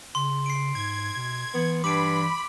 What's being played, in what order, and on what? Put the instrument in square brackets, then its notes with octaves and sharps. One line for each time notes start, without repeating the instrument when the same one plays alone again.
[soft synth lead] C#3 [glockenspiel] C6
[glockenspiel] C7 D7
[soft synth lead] G#2 [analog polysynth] G#6
[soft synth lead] B2
[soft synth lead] E3 [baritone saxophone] B3
[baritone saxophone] G2 [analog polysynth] B5 [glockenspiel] D6 D7